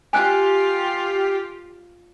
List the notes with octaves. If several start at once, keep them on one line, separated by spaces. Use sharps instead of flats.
F4 G4 G#5 F#6